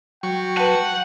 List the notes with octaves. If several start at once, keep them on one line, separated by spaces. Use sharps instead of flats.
F#3 G5 C#6
B4 F#5 A5